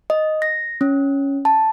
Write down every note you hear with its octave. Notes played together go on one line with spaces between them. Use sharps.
D#5
A#6
C#4
A5